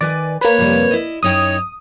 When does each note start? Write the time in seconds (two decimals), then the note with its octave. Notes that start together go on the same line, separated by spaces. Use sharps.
0.01 D#3 B4 D5 G#5
0.41 A#3 B4 C#5
0.59 F2 C3 G3
0.91 E4 D#5
1.23 F#2 D#4 C#5 G5 D#6